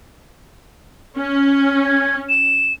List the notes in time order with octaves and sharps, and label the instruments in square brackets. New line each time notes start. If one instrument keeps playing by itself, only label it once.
[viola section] C#4
[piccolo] G#6
E7